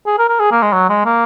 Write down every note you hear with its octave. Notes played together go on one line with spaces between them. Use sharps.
G#4
A#4
A#4
G#4
A#3
G#3
F#3
G#3
A#3